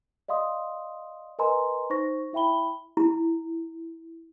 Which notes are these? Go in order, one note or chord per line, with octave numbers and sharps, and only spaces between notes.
D5 D#5 F5 C6 D#6
A#4 B4 D#5 G#5 A#5 C6
D#4 C5 C#6 A#6
E4 E5 G5 B5 G7
E4